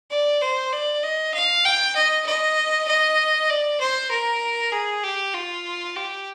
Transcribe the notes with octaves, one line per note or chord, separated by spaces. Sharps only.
D5
C5
D5
D#5
F5
G5
D#5
D#5
D#5
D5
C5
A#4
G#4
G4
F4
G4